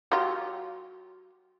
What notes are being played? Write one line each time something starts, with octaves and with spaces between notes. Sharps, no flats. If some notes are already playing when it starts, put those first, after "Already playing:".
F#3 F4 G4